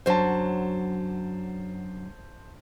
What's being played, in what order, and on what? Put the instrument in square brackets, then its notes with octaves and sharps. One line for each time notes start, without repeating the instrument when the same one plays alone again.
[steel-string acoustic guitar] F#2 D3 F#3 [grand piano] C5 A5